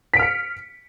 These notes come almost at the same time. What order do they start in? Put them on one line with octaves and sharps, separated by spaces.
B6 D7 F6 C#7